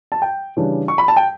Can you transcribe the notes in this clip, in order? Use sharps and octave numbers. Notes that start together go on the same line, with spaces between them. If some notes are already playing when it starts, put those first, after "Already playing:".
A5
G5
C#3 E3 G3 D4
C#6
B5
A5
G5